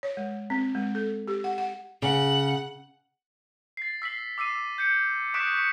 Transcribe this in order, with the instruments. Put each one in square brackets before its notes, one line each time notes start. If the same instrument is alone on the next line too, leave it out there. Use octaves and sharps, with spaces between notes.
[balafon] C#5
G#3
C4
G#3
A4
G4
F#5
F#5
[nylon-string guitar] C#3 [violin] F#5
[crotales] A6 C7
E6 B6 C7 F#7
D6 E6 C7 D#7
G6 C#7
C#6 D#6 F#6 B6 D7 E7
C#6 C#7